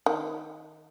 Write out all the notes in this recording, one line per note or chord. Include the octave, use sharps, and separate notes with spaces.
D#3